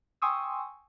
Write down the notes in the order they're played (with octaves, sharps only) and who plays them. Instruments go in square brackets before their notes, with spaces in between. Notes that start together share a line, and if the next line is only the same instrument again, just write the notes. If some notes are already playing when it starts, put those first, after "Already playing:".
[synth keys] G5 G#5 C6 C#6 D#6 E6